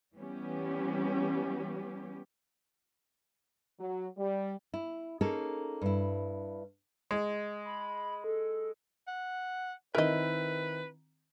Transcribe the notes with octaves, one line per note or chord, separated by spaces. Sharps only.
E3 G3 B3 C#4 G4
F#3
G3
E4
A#3 C#4 D#4 G#4 A4
G2 E4
G#3
B5
A4
F#5
D#3 C4 E4 A#4 B4 D#5